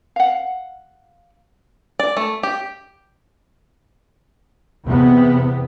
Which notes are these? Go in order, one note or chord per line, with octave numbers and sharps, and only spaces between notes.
F5 F#5
D5
A3
G4
E2 C3 B3